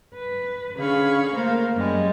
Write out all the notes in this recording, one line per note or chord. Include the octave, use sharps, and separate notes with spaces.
B4
D3 C#4 G#4 F5 B5 C#6
A3 A#3 A#4 C5 F5
F#2 G3 G#3